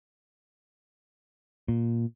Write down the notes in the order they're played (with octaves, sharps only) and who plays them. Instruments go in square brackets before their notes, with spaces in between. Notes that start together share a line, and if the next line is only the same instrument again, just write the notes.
[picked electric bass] A#2